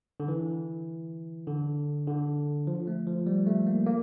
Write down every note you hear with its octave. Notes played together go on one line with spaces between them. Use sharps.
D3
E3
D3
D3
F3
A3
F3
G3
A3
A#3
A#3